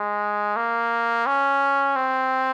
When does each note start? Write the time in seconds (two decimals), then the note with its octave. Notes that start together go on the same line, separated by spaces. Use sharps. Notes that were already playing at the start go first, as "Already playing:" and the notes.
Already playing: G#3
0.56 A#3
1.26 C#4
1.96 C4